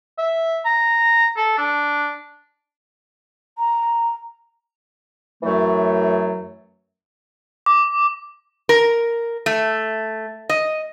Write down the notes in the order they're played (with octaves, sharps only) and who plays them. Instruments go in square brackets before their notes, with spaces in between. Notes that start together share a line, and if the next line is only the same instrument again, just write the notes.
[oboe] E5
A#5
A4
D4
[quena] A#5
[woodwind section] F#2 E3 F#3 A3
[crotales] D6
[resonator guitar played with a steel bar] A#4
A3
D#5